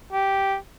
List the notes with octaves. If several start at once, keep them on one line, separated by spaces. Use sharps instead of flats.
G4